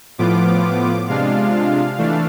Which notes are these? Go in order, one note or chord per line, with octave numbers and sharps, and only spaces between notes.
A2 F3 B3 F4 D6
C3 G#3 D4 F4 F5
E3 A3 D4